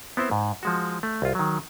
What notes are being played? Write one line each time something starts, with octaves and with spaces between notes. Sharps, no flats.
B3 C4 E4 C5
G#2
F3 G#3 F#4
A3
C2 F4
D#3 F#3